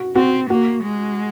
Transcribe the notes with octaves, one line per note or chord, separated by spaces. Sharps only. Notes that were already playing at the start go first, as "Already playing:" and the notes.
Already playing: F#4
C4 F#4
A#3 F#4
G#3